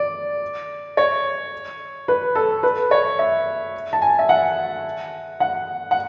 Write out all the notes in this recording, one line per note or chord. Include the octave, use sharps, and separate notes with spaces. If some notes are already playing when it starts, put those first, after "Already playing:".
Already playing: D5
C#5
B4
A4
B4
C#5
E5
A5
G#5
E5
F#5
F#5
F#5